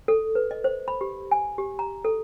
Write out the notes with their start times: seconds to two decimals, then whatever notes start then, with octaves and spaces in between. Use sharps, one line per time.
0.08 A4
0.35 B4
0.51 D#5
0.64 C5
0.88 B5
1.01 G4
1.31 G#5
1.58 G4
1.79 A#5
2.05 A4